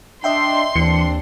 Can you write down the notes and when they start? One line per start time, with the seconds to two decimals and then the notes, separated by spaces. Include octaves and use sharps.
0.24 D4 D#5 E5 G5 C6
0.75 D#2 E3 A#3 C4 D4 C#7